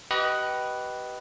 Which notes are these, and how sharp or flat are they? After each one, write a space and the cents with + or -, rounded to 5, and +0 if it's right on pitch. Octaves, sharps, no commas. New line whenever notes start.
G4 -30 B4 +0 D#5 +0